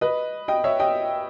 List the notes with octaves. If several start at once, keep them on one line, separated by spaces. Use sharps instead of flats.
B4 D#5
D#5 G5
C#5 E5
D#5 G5